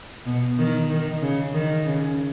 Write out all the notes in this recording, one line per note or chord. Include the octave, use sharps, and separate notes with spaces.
B2
D#3
D#3
C#3
D#3
C#3